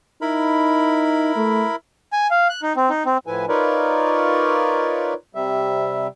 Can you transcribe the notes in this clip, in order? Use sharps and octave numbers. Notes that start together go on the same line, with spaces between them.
D#4 E4 A#4 B5
A3
G#5
F5
F#6
D#4
C4
D#4
C4
A2 F3 E4 B4 G#5
D#4 F4 A#4 B4 C#5 D5
C3 G3 E5